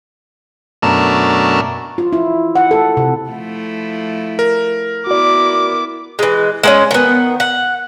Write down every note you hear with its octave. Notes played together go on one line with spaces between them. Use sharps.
F#2 B2 A3 D4 A#4 A5
F4
E4
F#5
A4
C3
F3 A3 E4
A#4
B3 E4 F#4 D5 D6
E3 G#3
G#3 A#3 C#4
D#3 B3
F#5